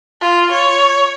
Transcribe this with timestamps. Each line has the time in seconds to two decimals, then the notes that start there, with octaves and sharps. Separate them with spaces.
0.21 F4
0.53 C#5